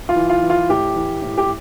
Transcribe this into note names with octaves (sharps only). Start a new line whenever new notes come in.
F4
E3
F4
E3
F4
A2 G4
E3
A2
G4